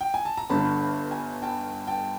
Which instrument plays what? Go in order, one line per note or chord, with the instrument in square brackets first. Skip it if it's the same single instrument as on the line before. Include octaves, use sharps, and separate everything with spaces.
[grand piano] G5
G#5
A5
A#5
[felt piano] G1 G2 D3 [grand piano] A5 B5
[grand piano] G#5 A#5
G5 A5
G5 A5